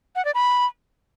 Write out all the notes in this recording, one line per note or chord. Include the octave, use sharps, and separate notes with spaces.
F#5
D5
B5